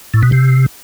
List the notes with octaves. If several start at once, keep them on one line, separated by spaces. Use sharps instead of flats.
A2
B2
C3